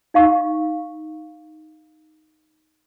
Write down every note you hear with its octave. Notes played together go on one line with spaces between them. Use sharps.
D#4 F5 C#6